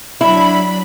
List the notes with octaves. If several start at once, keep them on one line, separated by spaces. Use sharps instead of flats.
F#3 D4 E4 B5